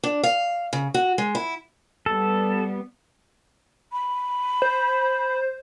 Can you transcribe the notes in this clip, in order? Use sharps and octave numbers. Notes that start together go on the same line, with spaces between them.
D4
F5
C#3
F#4
G#3
E4
G3 B3 A4
B5
C5